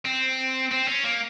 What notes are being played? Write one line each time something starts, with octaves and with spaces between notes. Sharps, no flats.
C4
C4
C#4
A#3